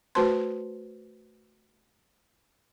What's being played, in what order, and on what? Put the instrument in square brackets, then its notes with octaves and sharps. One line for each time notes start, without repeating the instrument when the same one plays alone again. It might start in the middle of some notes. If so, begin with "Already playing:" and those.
[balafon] A3 F#4 B4 C5 A5 C6